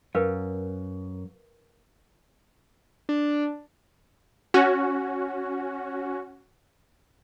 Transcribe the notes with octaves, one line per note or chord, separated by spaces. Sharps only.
F#2 A#4 B4 F5
D4
C#4 F#4